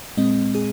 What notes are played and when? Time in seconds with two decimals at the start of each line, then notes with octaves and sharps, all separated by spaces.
0.17 A#2 G#3 C4 D#5
0.55 G#4